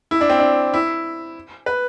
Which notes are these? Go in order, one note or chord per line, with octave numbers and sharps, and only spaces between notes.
E4
D4
C4
D4
E4
B4